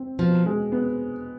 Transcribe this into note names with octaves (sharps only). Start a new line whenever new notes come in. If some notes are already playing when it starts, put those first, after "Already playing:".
Already playing: C4
B2 F3
G#3
B3